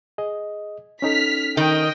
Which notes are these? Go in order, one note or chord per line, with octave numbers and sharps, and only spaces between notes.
G#4 D#5
C#4 D#4 A4 F6 B6
D#3 D#5 G5